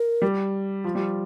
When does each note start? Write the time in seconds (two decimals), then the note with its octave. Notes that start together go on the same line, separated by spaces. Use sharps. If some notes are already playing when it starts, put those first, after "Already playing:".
Already playing: A#4
0.22 G3
0.84 F3
0.95 G3